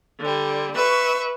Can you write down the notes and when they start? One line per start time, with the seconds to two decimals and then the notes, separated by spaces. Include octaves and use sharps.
0.20 D3 G3
0.76 B4 E5 C#6